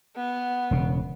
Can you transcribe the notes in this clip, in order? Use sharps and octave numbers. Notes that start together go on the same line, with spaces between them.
B3
E1 C#3